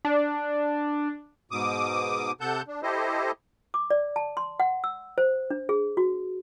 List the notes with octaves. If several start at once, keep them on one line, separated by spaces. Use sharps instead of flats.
D4
G#2 B2 D6 D#6
C3 A4 F#5 A5 G6
D4
E4 G4 A4 C5 D#5
D6
D5
A5
C6
F#5
E6
C5
D4
G#4
F#4